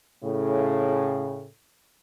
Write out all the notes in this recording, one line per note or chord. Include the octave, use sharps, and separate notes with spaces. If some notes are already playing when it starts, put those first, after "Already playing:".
A2 C#3